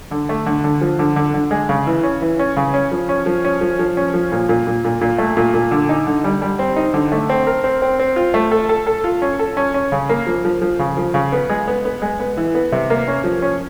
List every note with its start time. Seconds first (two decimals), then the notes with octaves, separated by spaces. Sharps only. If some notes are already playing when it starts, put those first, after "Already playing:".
0.11 D3
0.29 A3
0.46 D3
0.64 D3
0.81 F3
0.99 D3
1.16 D3
1.34 D3
1.51 G#3
1.69 C#3
1.87 E3
2.03 C#4
2.22 E3
2.39 C#4
2.57 C#3
2.74 C#4
2.92 F3
3.09 C#4
3.26 F3
3.45 C#4
3.61 F3
3.79 F3
3.97 C#4
4.14 F3
4.32 A#2
4.49 A#2
4.67 A#2
4.85 A#2
5.01 A#2
5.18 A3
5.37 A#2
5.54 A#2
5.71 D3
5.89 D#4
6.07 D3
6.24 G3
6.42 G3
6.59 C4
6.76 D#4
6.94 D3
7.12 A3
7.30 C4
7.47 A#4
7.64 C4
7.82 C4
8.00 C4
8.16 F4
8.34 A3
8.51 A4
8.69 A4
8.87 A4
9.04 F4
9.22 C#4
9.39 A4
9.57 C#4
9.74 C#4
9.92 C#3
10.09 A#3
10.27 F3
10.45 F3
10.62 F3
10.79 C#3
10.97 F3
11.14 C#3
11.32 B3
11.50 G#3
11.68 B3
11.85 B3
12.02 G#3
12.19 B3
12.37 E3
12.55 B3
12.72 C3
12.90 A#3
13.08 C#4
13.24 F3
13.42 C#4